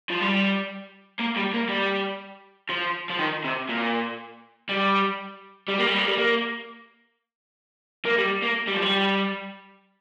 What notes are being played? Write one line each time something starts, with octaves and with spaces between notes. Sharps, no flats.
F3
G3
A#3
G3
A#3
G3
F3
F3
D#3
C3
A#2
G3
G3
A#3
G3
A#3
G3
A#3
A#3
G3
A#3
G3
F3
G3